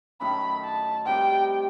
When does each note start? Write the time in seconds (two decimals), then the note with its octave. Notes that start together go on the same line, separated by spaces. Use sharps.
0.21 F#2 D#3 A3 D#4 B5
0.64 A5
1.06 C3 D#3 G3 G5